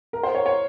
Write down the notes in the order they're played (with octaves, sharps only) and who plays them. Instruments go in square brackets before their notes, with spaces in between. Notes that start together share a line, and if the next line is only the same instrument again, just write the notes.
[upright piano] A#4
C5
C#5
C#5